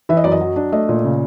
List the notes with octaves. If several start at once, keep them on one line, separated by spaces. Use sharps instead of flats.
E3 E5
D#5
F#2 D5
D#5
F#3
D4
A3 D#5
A#2
C#3